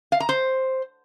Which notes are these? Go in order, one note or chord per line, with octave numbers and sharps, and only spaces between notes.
F5
A#5
C5